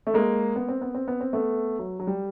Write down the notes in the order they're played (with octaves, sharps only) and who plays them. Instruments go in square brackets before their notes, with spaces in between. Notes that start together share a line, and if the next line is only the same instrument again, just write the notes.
[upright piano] A3
G#3 A#3
B3
C4
B3
C4
B3
C4
A3 B3
F#3
F#3
G3